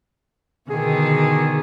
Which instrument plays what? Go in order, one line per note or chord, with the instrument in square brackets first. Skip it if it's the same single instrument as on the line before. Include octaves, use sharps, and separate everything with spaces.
[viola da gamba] B2 D3 D#3 [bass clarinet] G#4